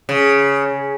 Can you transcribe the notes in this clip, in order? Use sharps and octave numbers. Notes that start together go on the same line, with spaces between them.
C#3